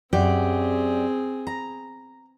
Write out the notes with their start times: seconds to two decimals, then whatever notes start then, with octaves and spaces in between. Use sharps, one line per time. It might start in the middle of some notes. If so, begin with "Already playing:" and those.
0.13 F#2 C4 G4 G#4 D5
1.47 A#5